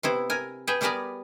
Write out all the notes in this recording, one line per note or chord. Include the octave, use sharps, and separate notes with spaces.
C3 B3 E4
A#4 G#5
G#4 B4 G5
G3 B3 G#4 A#4 B4 D5